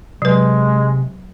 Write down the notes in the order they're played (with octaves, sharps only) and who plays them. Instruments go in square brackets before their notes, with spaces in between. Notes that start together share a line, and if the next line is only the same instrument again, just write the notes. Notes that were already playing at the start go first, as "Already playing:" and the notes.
[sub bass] C3 [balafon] F#3 B4 [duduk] G#3